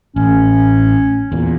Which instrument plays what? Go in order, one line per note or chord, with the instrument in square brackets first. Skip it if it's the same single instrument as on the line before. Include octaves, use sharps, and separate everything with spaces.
[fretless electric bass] A1 [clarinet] C#4
[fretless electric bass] E2 A#2